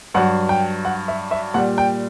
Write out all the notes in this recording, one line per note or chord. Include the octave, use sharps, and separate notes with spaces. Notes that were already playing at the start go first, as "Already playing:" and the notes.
G2 F#3 F#5
G5
F#5
E5
E5
A#2 G3 F#5
G5